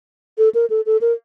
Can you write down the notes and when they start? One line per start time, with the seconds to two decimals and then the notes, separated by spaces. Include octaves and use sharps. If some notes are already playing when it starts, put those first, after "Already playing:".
0.38 A4
0.55 A#4
0.70 A4
0.86 A4
1.01 A#4